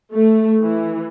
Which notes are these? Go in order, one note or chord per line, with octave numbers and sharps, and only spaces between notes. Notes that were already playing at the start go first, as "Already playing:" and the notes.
A3
E3